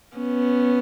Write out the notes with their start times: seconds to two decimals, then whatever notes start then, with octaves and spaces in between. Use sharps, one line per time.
0.17 B3 C#4